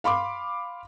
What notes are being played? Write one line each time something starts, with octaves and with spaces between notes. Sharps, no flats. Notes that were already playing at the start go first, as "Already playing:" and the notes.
F5 B5 C6 D6